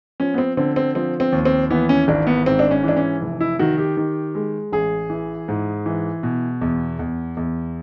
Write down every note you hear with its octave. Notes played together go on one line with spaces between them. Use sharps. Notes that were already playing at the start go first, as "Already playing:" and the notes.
F3 C#4
B3
C4
D3 C4
C4
F3 C4
C4
D#2
C4
E3 B3
C#4
G#1 D4
B3
G#2 C4
D4
C#4
E3 D4
C#4
F1
E4
D#3 F#4
G4
D#3
G#3
A1 G#4
E3
G#2
E3
B2
E2
E2
E2